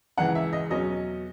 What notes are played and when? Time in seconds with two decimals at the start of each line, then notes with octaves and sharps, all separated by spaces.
0.17 C#2 C#3 E3 F#5
0.35 E5
0.53 D#5
0.70 E2 B2 F#3 C#4 D#5